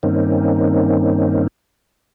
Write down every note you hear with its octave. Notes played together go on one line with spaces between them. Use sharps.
G2 D#3 A#3 C4 C#4 D#4